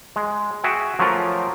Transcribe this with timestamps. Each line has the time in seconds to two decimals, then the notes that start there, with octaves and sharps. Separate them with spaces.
0.16 G#3
0.64 F#4 G#4 E5 G5
0.99 F3 F#3 A3 C#4 F4 A#4